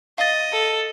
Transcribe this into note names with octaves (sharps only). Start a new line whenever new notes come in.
D#5 F5 A6
A4